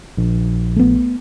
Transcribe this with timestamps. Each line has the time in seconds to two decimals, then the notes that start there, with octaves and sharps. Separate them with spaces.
0.18 A#1
0.76 A3 B3